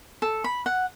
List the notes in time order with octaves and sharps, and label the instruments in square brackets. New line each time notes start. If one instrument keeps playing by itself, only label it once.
[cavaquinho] A4
B5
F#5